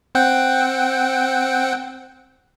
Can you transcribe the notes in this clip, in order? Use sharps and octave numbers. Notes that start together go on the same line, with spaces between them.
C4 F#5 G5